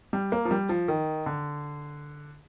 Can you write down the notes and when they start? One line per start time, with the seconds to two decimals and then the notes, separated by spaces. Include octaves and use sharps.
0.13 G3
0.32 A#3
0.45 F3
0.51 G3
0.69 F3
0.88 D#3
1.26 D3